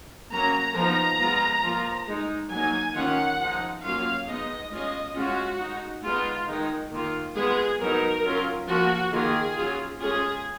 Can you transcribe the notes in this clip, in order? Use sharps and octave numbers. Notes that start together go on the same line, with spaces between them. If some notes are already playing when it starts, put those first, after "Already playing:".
F#3 A#3 C#4 A#5
F3 B3 D#4 A#5
G#3 B3 F4
F3 A#3 F4
G#3 D#4
F#3 A#3 D#4 G#5
D#3 A#3 C#4 F4 F#5
F3 G#3 D#4
F#3 A#3 C#4 F4 F5
G#3 B3 D#4 D#5
G#3 C#4 F4 D#5
G#3 C#4 F4 F#4
G#3 D#4
G#3 B3 D#4 F4
D#3 G#3 D#4
D#3 A#3 F4
G#3 B3 F4 G#4
F#3 B3 D#4 A#4
F#3 C#4 F4
F3 A#3 F4 F#4
D#3 A#3 F4 G#4
F#3 C#4 F4
G#3 C#4 F4 G#4